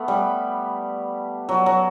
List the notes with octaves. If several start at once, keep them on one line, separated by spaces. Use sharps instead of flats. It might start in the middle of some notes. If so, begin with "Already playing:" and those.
Already playing: A3 B3
G3
F#3
F#3